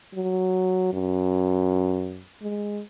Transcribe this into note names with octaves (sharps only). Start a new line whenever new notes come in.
F#3
F#2
G#3